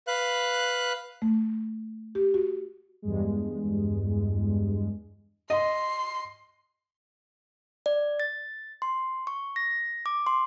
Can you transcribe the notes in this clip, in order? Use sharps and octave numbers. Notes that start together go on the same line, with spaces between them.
B4 F5 F#6
A3
G4
F#4
E2 G2 G#3
D#5 C6
D5
A6
C6
C#6
A#6
D6
C6